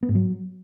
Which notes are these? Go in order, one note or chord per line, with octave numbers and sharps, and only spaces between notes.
B3
G#2
F#3